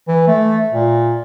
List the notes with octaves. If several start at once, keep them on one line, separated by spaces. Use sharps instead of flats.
E3
A3
A#2